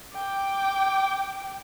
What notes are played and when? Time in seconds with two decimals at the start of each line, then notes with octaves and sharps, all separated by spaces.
0.15 G5 D6